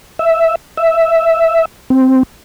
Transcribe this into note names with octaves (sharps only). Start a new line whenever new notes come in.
E5
E5
C4